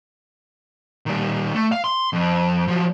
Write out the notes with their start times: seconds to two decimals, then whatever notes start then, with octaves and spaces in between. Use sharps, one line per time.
1.06 D#3 G3
1.55 A3
1.72 F5
1.84 C6
2.13 F2
2.68 F3 F#3